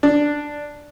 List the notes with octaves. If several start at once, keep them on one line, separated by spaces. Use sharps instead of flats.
D4